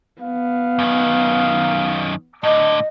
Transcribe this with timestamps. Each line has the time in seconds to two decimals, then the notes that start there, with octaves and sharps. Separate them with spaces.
0.22 B3 F5
0.79 F#2 D#3
2.44 A2 D3 D#5